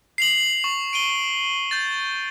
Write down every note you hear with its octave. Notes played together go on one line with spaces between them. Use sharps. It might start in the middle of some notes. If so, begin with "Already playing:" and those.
C7 F7 F#7
C#6
D7 D#7 G7
G6 A6